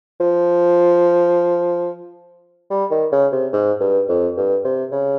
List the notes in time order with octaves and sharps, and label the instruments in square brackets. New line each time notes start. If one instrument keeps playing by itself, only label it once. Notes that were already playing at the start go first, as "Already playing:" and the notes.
[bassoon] F3
G3
D#3
C#3
C3
G#2
G2
F2
G2
C3
C#3